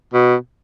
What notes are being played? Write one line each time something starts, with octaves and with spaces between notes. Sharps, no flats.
B2